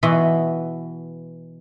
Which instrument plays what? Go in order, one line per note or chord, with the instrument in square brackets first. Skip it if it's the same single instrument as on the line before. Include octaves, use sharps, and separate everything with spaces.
[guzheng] B2 E3 B3 F#4 C6